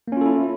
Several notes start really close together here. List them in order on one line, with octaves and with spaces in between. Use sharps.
A#3 C#4 F4 A4 E4